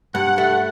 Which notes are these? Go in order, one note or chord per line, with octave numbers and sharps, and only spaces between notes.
G2 F#5
A3